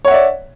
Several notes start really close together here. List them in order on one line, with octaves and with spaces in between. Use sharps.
C#5 F#5 E5 D5